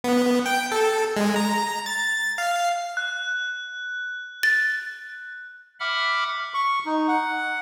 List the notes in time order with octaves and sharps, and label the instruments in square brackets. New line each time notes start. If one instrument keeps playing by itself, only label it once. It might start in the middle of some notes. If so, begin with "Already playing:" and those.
[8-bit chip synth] B3
G5
A4
G#3
A#5
A6
F5
[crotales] F#6
[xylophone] A6
[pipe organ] E5 F#5 B5 D6 F6
[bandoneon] C#6
D#4
F#5